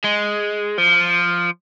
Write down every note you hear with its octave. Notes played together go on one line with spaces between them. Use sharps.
G#3
F3